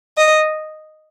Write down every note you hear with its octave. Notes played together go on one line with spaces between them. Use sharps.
D#5